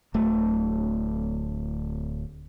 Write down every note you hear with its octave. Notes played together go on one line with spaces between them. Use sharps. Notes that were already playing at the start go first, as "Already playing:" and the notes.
D1 A3